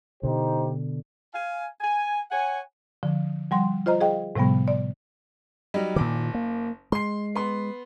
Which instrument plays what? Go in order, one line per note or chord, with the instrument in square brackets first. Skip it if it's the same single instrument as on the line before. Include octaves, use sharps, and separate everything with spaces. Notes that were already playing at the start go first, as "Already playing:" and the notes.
[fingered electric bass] B2 D3 [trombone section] D#4 G4 C5
[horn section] F5 G#5
G#5
C#5 F#5 G#5
[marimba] D3 F3
F3 G3 F#5 C6
F4 C5 D#5 A#5
G#4 D#5 F5 G5
A2 C3 F3 G3 B3
D5
[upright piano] F#3 G3 D#4
[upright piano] F#1 D6 [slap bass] A#2 D#3
[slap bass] A#3
[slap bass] G#3 [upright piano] C6 C7
[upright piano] B3 C6